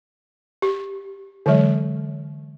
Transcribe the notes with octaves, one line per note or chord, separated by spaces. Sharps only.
G4
D3 E3 F#3 G#3